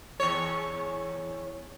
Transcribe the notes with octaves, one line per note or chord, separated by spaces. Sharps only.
E2 C#5